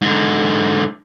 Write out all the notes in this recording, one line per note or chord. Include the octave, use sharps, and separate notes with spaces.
G#2 D3